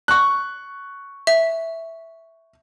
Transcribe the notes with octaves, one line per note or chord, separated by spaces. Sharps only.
C#6 F#6
E5